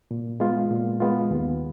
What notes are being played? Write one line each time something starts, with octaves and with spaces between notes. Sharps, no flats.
A#2
G#3 B3 F4
A#2
G#3 B3 F4
D#2